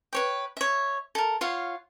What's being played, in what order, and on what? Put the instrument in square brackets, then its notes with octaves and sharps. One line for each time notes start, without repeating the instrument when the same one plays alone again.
[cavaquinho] B4 C#5 G5
C#5 E5
A4 A#4
F4 C#5 F5 F#5